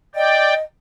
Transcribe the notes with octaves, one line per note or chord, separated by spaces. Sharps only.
D5 D#5 G5